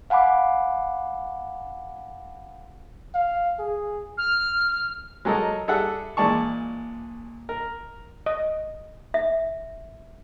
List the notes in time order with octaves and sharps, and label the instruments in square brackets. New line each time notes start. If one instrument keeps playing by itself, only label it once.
[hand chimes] F5 F#5 G#5 B5 D6
[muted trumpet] F5
G#4
[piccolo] F6
[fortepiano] F#3 G#3 A4 A#4 D#5
G3 G#4 A4 E5 F#5 E6
A#2 E3 G#3 D5 A5 C#6
A#4
[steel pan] D#5
[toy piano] E5